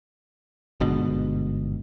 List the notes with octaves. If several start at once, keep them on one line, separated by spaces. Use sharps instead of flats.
G1 G#2 B2 D3